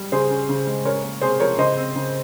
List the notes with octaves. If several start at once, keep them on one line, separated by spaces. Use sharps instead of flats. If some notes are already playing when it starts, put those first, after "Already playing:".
Already playing: G3
C#3 G#4 C5
C#4
C#3
G#3
C#4 A#4 C#5
A#3
C3 G#4 C5
F3 A#4 C#5
C#3 C5 D#5
C4
C#3